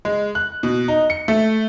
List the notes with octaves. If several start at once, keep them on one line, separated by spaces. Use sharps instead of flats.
G#3
F#6
B2
D#4
C#7
A3